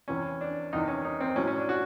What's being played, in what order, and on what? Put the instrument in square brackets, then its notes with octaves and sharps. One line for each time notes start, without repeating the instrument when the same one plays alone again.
[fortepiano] E2 C3 E3 C#4
D4
E2 C3 D#3 D#4
C#4
D#4
C4
A2 F#3 C#4
C#4
D4
F#4